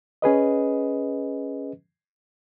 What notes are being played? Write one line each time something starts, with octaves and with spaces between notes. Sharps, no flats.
C#4 G#4 B4 D#5